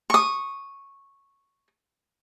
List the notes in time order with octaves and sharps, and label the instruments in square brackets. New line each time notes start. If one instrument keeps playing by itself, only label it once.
[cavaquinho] C#6 D#6